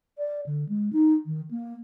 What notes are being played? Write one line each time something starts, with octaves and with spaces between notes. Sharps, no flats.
D5
D3
G#3
D#4
D#3
A#3